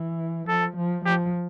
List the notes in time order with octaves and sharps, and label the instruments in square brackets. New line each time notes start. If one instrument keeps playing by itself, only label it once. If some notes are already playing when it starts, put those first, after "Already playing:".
Already playing: [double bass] E3
[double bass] F3 [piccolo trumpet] A4
[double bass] F3
[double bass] F3 [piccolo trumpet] G4